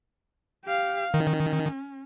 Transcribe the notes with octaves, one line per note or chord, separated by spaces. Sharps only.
G4 F5
D#3 C#4